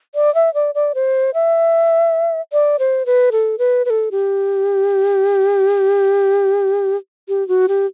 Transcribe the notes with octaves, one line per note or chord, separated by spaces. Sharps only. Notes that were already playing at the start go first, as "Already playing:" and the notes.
D5
E5
D5
D5
C5
E5
D5
C5
B4
A4
B4
B4
A4
G4
G4
F#4
G4